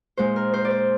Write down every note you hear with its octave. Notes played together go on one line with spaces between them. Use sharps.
A#2 G#3 D#4 C5
A#4
C5
D5
C5